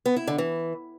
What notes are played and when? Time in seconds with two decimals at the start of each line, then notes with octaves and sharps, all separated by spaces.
0.06 B3
0.16 E4
0.27 D3
0.38 E3